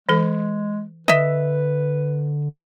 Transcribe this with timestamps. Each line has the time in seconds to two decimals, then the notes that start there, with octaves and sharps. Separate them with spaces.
0.09 E3 G#3 A4
1.08 D3 B4 D#5 E5